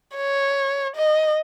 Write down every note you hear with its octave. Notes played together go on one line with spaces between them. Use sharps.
C#5
D#5